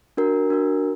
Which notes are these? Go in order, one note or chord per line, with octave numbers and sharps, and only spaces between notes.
D4 F#4 A#4
D4 F#4 A#4